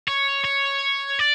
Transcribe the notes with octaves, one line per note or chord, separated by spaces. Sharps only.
C#5
C#5
D5